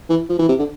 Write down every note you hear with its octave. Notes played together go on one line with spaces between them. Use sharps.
E3
F3
E3
C3
D3